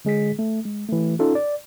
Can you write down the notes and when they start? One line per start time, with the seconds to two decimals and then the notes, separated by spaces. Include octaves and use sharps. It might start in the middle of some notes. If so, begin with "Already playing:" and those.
0.05 D3 G#3 G#4 B6
0.39 A3
0.65 G#3
0.89 E3 A3
1.19 C#4 D#4 F4 A4
1.35 D5